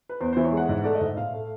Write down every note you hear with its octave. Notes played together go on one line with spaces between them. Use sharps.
B4
E2 C5
C5
E3
C#5
G#3 F#5
G#2
A3 D5
D#5
G#2 E5
A2 F5
A3